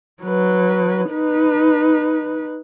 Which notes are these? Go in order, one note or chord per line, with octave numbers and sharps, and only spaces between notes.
F#3 B4
D#4 B4